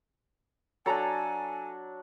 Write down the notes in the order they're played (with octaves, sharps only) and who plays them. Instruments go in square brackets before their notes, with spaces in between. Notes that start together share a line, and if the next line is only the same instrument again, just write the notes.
[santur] F#3 D4 [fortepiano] A4 A#5 [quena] G#5